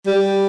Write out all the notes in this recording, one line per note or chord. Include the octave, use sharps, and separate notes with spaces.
G3